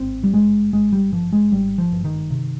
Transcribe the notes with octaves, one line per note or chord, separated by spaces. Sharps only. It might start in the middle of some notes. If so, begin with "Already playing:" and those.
Already playing: G#1 G2 C4
G3
G2 G#3
G#1 G#3
G3
G2 F3
G#3
G#1 G3
F3
G2
D#3
C3